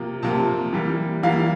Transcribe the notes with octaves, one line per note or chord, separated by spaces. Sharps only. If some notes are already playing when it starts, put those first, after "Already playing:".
Already playing: C3 F3 A#3
C3 F3 A#3 A5
E3 G3 A#3
E3 G3 A#3 F5